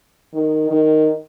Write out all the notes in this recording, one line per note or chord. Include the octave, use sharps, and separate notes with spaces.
D#3
D#3